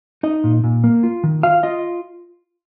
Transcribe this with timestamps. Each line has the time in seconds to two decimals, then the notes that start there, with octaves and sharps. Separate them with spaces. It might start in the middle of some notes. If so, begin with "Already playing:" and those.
0.23 D#4 D#5
0.44 A#2
0.64 A#2
0.84 A#3
1.03 F4
1.24 D#3
1.43 F4 F5
1.63 F4 D#5